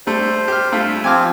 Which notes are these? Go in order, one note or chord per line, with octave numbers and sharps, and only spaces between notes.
G3 A3 C5
G4 F6
G2 A3 F4
F3 C4 G#5 D6 F6